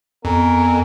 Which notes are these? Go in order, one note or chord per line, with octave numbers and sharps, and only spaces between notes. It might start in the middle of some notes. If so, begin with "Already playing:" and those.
F2 B3 A#4 G#5